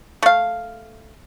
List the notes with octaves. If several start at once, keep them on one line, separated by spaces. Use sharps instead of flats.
A3 F5